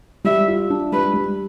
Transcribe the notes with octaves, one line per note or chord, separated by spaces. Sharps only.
G3 E5
F4
D4
G3 B4
G3